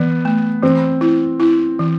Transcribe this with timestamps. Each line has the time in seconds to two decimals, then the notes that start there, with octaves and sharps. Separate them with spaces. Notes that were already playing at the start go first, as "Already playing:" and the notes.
Already playing: E3 B3
0.25 A3
0.63 E3 C4
1.01 E4
1.40 E4
1.79 E3